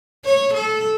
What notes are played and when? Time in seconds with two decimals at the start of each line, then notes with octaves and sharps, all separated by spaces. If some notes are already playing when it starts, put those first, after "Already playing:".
0.25 C#5
0.54 A4